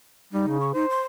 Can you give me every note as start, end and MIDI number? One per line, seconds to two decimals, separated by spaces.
0.33 0.46 55
0.33 0.58 63
0.47 0.69 49
0.60 0.71 85
0.74 0.86 63
0.74 1.05 72
0.90 1.00 84